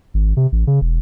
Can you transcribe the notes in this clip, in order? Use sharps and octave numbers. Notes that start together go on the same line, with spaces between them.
G#1
C3
A1
C#3
E1